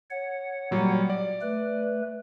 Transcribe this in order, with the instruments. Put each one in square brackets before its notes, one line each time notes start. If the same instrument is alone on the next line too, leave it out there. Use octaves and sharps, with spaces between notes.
[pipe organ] C#5 F#5
[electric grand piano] A#2 F#3 G3
D5
[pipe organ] A3 B4